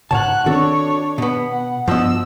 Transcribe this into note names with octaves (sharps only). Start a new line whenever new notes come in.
G#2 C#3 F#4 C#5 A5 F#6
D#3 C4 D4 F#4 A4 C#5
B2 B3
F#5
G2 F3 B3 F#4 D#5 E6